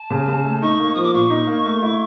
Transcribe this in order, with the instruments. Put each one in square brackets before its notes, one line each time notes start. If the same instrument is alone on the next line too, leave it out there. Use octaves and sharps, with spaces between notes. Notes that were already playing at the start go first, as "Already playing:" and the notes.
Already playing: [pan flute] A5
[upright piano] C#3
C#3
A3
[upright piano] D#4 [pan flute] C#6
[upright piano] A#3
[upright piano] F3 [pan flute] D#6
[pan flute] D6
[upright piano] A#2 [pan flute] C#6
[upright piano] D#4
A#3
A3
E4